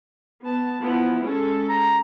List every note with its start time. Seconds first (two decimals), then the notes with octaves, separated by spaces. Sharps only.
0.44 B3 A5
0.80 F3 B3 E4
1.22 G#3 C#4 A4
1.69 A#5